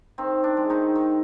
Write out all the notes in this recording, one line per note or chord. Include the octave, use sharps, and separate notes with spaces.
D#3 C4
D4
G#3
D#3 D#4
D#3